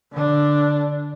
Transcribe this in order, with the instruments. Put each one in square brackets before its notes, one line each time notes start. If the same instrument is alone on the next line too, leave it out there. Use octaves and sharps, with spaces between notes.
[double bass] D3 D4